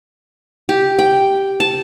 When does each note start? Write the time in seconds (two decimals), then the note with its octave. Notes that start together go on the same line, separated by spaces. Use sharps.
0.69 G4
0.99 G5
1.60 A5